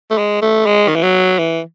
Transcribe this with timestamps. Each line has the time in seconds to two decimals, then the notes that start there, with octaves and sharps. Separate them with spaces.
0.11 A3
0.18 G#3
0.42 A3
0.66 G#3
0.88 D#3
0.96 E3
1.03 F#3
1.39 E3